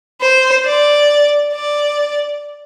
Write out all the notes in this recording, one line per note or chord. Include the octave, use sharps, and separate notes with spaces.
C5
D5
D5